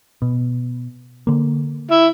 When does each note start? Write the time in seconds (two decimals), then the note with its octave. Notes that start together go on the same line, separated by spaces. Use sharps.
0.22 B2
1.27 D3 A#3
1.91 E4